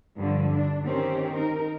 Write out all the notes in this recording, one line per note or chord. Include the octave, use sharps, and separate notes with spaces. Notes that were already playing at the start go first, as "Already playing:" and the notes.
G2 D3 F3
D4
D#3 C4 C#4 G4
D#4 A#4